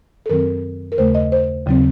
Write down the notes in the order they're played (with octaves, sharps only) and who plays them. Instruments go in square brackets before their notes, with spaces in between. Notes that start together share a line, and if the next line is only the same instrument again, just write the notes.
[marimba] A4
F#2 D#3 F#3 C4 A#4
A#4
D#2 C#3 A3 C5
D#5
C5
D#2 C#3 F#3 C4